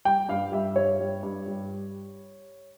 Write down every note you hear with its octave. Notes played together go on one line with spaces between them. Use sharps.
G3 G5
G2 F5
G3 E5
G2 C#5
G3
G2
G3